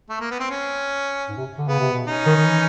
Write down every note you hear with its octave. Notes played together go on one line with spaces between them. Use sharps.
A3
A#3
B3
C4
C#4
G#2
C3
D3
C#3 B3
C3
B2
C#4 D#4
D#3
D#3
E3